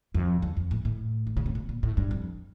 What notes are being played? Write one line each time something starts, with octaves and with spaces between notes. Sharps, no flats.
F2
E2
F2
A2
A2
D3
C#3
C3
B2
A#2
A2
G2
F2